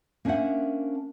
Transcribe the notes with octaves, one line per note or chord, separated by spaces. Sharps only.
A#3 C#4 D4 C5 E5 F#5